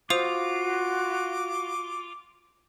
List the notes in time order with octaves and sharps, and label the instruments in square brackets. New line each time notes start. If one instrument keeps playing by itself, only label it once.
[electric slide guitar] F4 [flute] F#4 [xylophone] C5 D#6 F7 [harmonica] D6